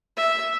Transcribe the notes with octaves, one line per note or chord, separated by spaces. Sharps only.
E5